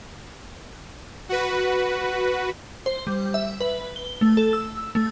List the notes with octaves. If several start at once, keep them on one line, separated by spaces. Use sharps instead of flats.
F#4 B4
C5
G3
E5
B4
G7
A3
A4
E6
A3